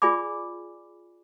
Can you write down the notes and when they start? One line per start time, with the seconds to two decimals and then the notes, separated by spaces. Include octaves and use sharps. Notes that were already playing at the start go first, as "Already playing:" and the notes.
0.02 F4 G#4 D5 G#5 B5 D6